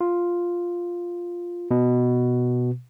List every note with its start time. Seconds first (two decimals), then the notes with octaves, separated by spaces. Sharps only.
0.01 F4
1.71 B2